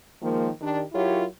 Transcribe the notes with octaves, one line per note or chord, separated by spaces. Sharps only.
D#3 F3 G#3 A#3
D#3 D4 G4
F#3 E4 F4 G4 A#4 C#5